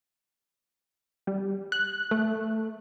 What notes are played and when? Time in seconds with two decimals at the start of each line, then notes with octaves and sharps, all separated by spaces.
1.27 G3
1.72 F#6
2.11 A3